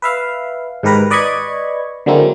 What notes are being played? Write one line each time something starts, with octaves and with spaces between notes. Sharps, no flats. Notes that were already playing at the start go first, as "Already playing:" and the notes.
B4 E5 F5
G#2 D#3 G4 A#4 B4 A#5
B4 D5 D#5 B5 C#6 G#6
D3 F#3 G#3 A#3 C4 E4